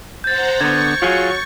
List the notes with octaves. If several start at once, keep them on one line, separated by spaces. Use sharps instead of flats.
C5 F#5 A#5 G6 A6
D3 B3 C#6 G#6
F#3 F4 G#4